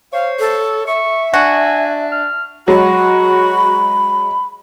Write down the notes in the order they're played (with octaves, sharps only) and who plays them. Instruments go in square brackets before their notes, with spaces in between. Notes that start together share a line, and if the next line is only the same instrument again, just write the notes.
[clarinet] C5 [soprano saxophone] C#5 [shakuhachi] F5
[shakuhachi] A4
[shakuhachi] E5 [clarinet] C#6
[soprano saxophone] D4 [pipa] F#4 [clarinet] G#5
[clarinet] F6
[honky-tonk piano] F#3 G#3 [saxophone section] F#4 [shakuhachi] B5